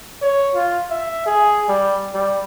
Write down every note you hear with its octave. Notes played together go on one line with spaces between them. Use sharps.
C#5
F4
E5
G#4
G3
G3